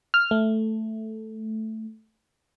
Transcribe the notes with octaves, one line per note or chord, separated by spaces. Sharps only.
F6
A3